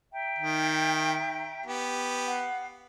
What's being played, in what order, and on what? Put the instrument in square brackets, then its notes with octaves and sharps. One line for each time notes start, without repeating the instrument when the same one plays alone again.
[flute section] E5 G5 A#5
[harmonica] D#3
B3 G4
[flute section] F5 F#5